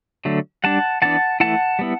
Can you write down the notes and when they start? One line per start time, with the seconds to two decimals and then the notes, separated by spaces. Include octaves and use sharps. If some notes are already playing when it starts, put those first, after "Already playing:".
0.25 D3 F#3 A3
0.64 G3 D4 F#5 A5
1.02 E3 B3 D4 F#5 A5
1.40 E3 A3 E4 F#5 A5
1.79 G3 B3 E4